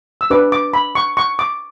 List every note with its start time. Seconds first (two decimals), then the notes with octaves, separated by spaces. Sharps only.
0.21 E6
0.30 D4 G4 B4 D6
0.52 D6
0.74 B5
0.95 C#6
1.17 C#6
1.39 D6